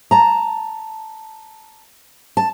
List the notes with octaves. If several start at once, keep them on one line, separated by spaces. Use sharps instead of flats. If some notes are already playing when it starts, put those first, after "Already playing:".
A5 A#5
A5